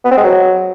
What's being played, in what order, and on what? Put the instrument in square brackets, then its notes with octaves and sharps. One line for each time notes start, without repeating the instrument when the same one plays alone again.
[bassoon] B3
C4
G#3
F#3